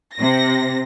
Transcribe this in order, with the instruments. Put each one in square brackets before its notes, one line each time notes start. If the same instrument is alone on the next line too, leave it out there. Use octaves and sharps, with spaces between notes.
[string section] C3 A#6